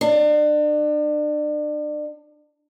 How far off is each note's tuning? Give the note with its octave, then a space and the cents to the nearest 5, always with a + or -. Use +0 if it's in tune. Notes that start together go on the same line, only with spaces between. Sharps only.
D4 +35